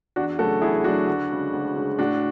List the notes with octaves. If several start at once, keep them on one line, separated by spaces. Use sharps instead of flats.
E2 D4 F#4
C#3 F#3 A3 F#4 A4
E2 E4 G#4
C#3 F#3 A3 D4 F#4
D2
C#3 G#3
D2
C#3 G#3
A2 D4 F#4